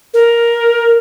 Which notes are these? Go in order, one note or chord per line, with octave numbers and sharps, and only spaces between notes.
A#4